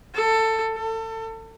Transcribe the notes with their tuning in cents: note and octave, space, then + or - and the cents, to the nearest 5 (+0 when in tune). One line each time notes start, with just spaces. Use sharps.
A4 +15
A4 +30